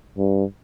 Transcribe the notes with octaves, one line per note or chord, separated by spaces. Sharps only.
G2